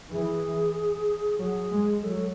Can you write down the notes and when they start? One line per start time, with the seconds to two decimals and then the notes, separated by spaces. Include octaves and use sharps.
0.12 E3 G#4
1.39 F#3 G#4
1.72 G#3
2.03 F#3 A4